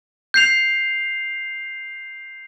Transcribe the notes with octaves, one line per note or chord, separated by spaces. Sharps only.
G6 C7 F7